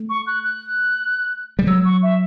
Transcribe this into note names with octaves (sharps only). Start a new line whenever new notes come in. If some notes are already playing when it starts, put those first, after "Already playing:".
Already playing: A3
C#6
F#6
F#6
G3
F#3 E6
C#6
E5